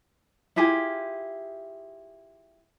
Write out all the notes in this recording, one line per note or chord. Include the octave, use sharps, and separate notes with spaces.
E4 F4 G4 G#4